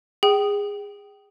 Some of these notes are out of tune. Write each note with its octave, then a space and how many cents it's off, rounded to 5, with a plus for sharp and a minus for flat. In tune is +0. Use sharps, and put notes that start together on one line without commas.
G#4 -20 G5 -20